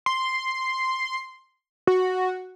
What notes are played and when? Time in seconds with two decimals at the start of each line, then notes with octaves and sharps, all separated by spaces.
0.06 C6
1.87 F#4